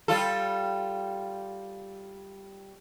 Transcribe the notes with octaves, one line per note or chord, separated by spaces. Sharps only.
G3 F4 A4